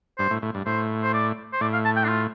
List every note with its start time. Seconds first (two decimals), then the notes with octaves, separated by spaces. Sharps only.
0.18 G2 C5
0.30 A2
0.42 A2
0.55 G2
0.66 A2 C5
1.03 C5
1.14 D5
1.53 C5
1.61 A2 D5
1.73 F5
1.85 A5
1.97 G5
2.04 D4
2.08 F4